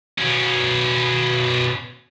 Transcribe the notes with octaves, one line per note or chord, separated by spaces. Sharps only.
B2 C#4